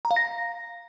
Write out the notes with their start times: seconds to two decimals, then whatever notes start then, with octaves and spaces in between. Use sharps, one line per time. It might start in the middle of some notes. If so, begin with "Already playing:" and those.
0.05 A#5
0.11 F5
0.16 A#6